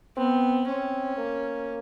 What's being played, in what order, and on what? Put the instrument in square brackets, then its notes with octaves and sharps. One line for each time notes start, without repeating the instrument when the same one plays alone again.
[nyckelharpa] B3 [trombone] C4
[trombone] C4 [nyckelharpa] C#4
[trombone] A#3